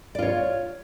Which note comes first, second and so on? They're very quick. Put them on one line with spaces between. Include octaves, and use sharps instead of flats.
D5 F4 C#5